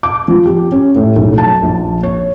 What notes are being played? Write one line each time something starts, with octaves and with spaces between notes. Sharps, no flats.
D6
F3
G4
C#4
A2
B1
A5
A#1
C#5